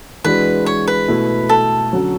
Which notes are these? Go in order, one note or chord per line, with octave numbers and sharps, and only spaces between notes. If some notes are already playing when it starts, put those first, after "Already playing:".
E3 G#3 D4 F#4 B4
C#5
B4
B2 A3 E4
A4
D3 F#3 C#4 F#4